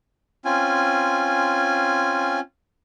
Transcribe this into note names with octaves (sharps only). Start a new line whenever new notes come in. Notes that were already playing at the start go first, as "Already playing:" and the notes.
C4 C#4 F4 G#5